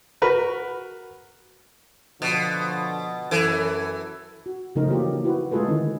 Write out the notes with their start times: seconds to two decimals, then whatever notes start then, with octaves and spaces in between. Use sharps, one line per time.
0.22 F#4 A#4 B4
2.22 B2 D3 F3
3.31 F#2 E3 A4
4.46 F#4
4.75 C#3 F3 A3 D#4 A#4
4.88 E3 F#3 A#3 F4 G4
5.24 E4 F#4 B4 C5
5.52 G#3 A3 F4 G#4 A4 B4
5.67 D3 D#3 C#4 E4